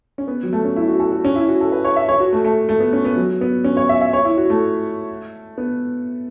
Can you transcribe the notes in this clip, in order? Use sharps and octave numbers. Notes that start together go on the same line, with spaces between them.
C#4
B3
F#3
A3
C#4
E4
F#4
A4
F#4
C#4
E4
F#4
A4
B4
C#5
E5
C#5
F#4
A3
A3
A3
B3
C#4
B3
F#3
B3
C#4
C#5
E5
E5
C#5
E4
F#4
A3
B3